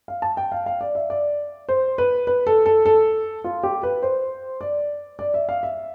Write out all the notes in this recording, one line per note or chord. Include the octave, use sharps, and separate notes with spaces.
F5
A5
G5
F5
F5
D5
E5
D5
C5
B4
B4
A4
A4
A4
F4
G4
B4
C5
D5
D5
E5
F5
E5